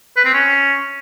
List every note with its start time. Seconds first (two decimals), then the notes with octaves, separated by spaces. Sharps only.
0.17 B4
0.25 C4
0.34 C#4